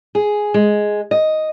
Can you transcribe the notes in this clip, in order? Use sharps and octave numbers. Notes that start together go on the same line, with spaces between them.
G#4
G#3
D#5